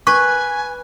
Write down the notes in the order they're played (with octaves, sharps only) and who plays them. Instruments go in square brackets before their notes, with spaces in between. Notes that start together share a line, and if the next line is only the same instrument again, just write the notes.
[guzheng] B4 [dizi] G#5 [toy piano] C#6